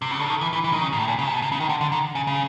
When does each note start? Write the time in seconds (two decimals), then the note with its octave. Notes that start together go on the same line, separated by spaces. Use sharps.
0.02 C3
0.11 C#3
0.20 D3
0.30 D#3
0.41 E3
0.53 E3
0.64 E3
0.73 D#3
0.81 C#3
0.93 G#2
0.99 A2
1.08 A#2
1.19 C#3
1.26 C3
1.34 B2
1.42 C3
1.52 C#3
1.60 D#3
1.69 D3
1.81 D3
1.92 D#3
2.15 C#3
2.27 C#3